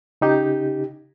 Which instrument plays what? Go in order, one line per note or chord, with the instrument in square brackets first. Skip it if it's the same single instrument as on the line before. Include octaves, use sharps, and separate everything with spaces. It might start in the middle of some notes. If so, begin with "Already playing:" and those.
[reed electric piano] C#3 D#4 G4